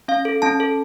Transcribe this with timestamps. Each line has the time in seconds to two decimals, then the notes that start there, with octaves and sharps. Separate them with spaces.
0.08 C#4 F5
0.25 A4
0.42 C#4 A5
0.60 A4